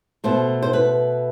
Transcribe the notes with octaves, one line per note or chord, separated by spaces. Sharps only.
B2 A3 C5
C5
B4